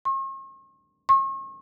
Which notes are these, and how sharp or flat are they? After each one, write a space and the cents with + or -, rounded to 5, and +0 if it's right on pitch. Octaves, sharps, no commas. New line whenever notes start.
C#6 -45
C#6 -40